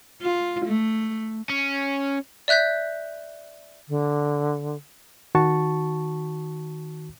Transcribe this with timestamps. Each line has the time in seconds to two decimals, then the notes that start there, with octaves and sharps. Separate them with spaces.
0.21 F4
0.65 A3
1.50 C#4
2.48 D5 E5 F#6 G6 B6
3.89 D3
5.35 D#3 F#4 A5 C#6